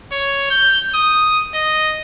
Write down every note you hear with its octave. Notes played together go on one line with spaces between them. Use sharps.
C#5
G6
D#6
D#5